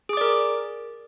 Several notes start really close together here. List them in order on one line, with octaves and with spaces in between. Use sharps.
G#4 D6 D5 A#4